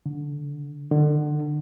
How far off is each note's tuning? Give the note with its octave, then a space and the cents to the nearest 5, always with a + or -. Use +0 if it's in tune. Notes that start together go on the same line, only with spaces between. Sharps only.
D3 -10
D3 +30